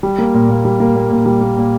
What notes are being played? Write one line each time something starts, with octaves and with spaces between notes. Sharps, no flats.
G3
A#3
A#2
A#2
G3
A#3
A#2
A#2
G3
A#3
A#2